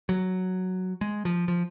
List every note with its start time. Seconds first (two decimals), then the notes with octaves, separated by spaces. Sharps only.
0.09 F#3
1.01 G#3
1.25 F3
1.48 F3